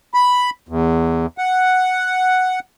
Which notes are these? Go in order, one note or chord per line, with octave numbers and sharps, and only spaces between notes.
B5
E2
F#5